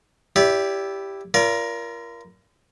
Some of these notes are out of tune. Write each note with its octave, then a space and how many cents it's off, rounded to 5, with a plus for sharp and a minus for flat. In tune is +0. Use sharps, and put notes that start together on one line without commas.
E4 +0 G4 +0 D5 -35
F4 -40 A#4 +15 D5 -40